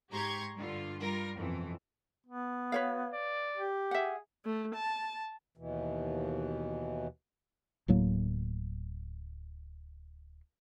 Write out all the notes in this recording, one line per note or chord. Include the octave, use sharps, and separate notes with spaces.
G#2 G4 A#5 C6 C#6 G#6
G2 D3 F4
G3 F4 A#4
F2 B2 E3
B3
F#4 B4 C#5 F5
D5
G4
G#4 E5 F#5
A3
A5
D#2 B2 E3
D1 A2 F#3 A#3